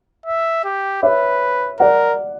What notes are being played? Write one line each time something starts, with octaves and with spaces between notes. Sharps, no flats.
E5
G4
B4 C#5 E5
A#4 D5 F#5